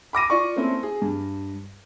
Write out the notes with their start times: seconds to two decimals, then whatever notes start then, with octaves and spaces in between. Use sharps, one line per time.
0.13 B5 D6 A#6 D#7
0.30 F4 D5 C#6
0.56 A3 A#3 C4 C#4 E4 A4
0.83 G#4
1.02 G2